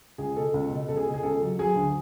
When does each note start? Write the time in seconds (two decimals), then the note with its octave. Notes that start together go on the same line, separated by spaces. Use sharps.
0.18 C#2 G#4
0.37 B2 A4
0.54 C#2
0.71 B2
0.88 C#2 A4
0.97 G#4
1.07 B2
1.14 G#4
1.23 C#2 A4
1.42 F#3
1.59 F#3 G#4
1.75 D2